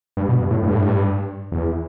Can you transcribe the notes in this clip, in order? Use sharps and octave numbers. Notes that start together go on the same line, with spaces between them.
G2
B2
G2
A2
G2
A2
G2
E2